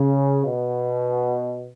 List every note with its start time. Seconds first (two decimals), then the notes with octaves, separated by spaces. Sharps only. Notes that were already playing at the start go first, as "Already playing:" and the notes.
Already playing: C#3
0.45 B2